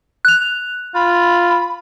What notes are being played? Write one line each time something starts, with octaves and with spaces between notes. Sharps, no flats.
F#6 F7
F4 B5